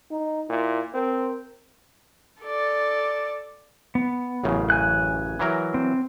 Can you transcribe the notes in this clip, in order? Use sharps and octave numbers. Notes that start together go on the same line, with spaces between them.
D#4
A#2 E4
C4 A#4
A4 D5
B3
A1 F#2 C#3
G#5 F#6
E3 F#3 A#4
C4